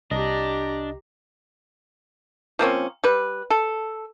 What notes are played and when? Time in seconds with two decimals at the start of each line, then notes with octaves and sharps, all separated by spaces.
0.11 C2 D4 G4 D#5 A#5
2.59 F3 A#3 C4 C#4
3.04 G3 B4
3.50 A4